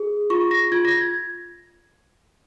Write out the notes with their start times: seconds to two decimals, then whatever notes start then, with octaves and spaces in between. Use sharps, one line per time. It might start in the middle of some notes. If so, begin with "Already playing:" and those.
Already playing: G#4
0.30 F4 C#6
0.51 A#6
0.72 F4 G#6
0.85 A#6
0.97 G#6